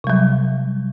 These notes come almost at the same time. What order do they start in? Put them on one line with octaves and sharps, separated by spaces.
C3 G3 F#3